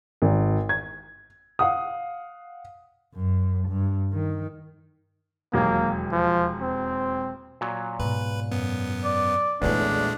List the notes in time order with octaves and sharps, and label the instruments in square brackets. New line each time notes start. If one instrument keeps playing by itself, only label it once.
[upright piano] G#1
G#6
F5 F#5 D#6
[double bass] F#2
G2
D#3
[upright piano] E1 D#2 F#3 [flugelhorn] A#3
[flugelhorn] F3
C4
[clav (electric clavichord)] A#2 F#3
[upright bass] G#2 B2 [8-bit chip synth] B4
[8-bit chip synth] F#2 B3
[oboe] D5
[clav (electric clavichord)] B1 E2 [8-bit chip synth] A#2 G#3 A3 [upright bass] D3 E4 [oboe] D4